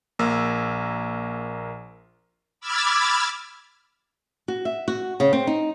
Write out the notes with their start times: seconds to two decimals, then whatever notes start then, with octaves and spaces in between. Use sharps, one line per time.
0.19 A#1 A#3 E6
2.60 B5 D6 E6 F6 G#6 A6
4.48 F#4
4.65 E5
4.88 F#4
5.20 C#3
5.33 C4
5.47 D#4